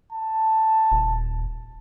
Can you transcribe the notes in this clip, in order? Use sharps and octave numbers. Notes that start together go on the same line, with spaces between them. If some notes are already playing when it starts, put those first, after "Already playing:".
A5
D#1